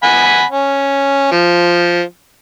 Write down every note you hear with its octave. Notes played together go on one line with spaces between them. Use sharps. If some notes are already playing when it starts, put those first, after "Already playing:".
F#5 G#5 B5
C#4
F3